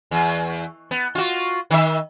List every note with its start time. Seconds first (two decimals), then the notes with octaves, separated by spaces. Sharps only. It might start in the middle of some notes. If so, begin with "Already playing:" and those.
0.11 E2
0.91 B3
1.15 F4 F#4
1.71 D#3 E5